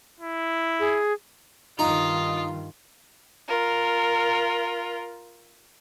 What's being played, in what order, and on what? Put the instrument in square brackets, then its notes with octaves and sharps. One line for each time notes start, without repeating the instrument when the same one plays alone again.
[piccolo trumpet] E4
[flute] G#4
[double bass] G2 D#3 [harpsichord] D#4 A#5 [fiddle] F4 [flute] D#6
[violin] F4 A#4